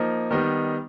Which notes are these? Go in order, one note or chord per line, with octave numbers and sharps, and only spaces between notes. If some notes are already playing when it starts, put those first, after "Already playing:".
Already playing: F3 A#3 D#4
D#3 G3 B3 D#4